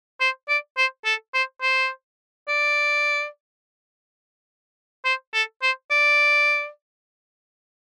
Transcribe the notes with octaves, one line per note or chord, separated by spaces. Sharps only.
C5
D5
C5
A4
C5
C5
D5
C5
A4
C5
D5